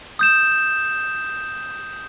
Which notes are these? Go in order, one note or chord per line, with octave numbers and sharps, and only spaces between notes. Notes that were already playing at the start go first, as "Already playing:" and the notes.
D#6 G6 E7